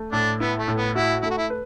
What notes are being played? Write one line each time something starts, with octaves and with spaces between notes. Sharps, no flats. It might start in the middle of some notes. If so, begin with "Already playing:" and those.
Already playing: A3
A2 D4
B3 E4
A3
A2
B3
E4 F#4
A3 E4
F#4
E4
B4